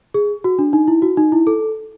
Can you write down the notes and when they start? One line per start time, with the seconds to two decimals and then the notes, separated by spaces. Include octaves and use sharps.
0.14 G#4
0.44 F#4
0.59 D4
0.73 D#4
0.88 E4
1.02 F#4
1.17 D#4
1.32 E4
1.47 A4